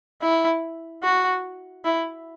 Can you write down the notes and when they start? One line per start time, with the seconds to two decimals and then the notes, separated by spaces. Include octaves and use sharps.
0.22 E4
1.03 F#4
1.85 E4